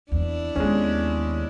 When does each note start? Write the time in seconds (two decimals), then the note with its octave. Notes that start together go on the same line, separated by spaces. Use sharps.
0.12 E2 C4 D4 E4
0.56 D#2 G#3 B3 C#4